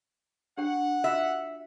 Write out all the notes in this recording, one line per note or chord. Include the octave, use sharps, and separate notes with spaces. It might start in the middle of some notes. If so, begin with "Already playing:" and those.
D4 G4 F#5 G5
F4 F#4 E5